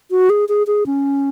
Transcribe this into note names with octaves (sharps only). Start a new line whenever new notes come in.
F#4
G#4
G#4
G#4
C#4